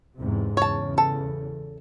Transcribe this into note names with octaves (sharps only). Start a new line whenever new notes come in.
E2 G#2 C3
E2 C#3 C#5 A5
A4